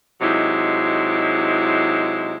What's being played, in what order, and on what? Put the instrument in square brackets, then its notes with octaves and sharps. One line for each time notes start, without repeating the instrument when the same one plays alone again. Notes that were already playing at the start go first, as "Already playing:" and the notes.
[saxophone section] C3 F#3 G#3 D#4 E4